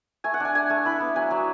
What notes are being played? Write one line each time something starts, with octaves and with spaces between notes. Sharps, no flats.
A3 G#5
F#5
D4 G#5
D4 G#5
A3
E4 B5
B3
F#3 G#5
F#3